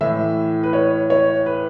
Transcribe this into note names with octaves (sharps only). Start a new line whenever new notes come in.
A2 E3 E5
B4
C#5
C#5
B4